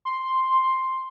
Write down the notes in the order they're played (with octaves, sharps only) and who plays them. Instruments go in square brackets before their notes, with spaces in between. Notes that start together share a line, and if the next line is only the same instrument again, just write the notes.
[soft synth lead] C6